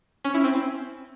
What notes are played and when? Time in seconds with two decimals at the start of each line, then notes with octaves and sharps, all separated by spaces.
0.24 C#4
0.34 E4
0.44 C4